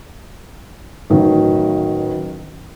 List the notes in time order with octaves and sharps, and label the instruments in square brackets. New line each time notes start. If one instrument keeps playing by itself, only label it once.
[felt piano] A1 D#3 F#3